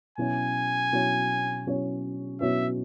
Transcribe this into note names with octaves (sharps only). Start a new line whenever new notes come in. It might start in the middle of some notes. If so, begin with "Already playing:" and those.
B2 F#3 C#4 E4 C#5 G#5
B2 F#3 C#4 E4 C#5
B2 F#3 C#4 E4 C#5
B2 F#3 C#4 E4 C#5 E5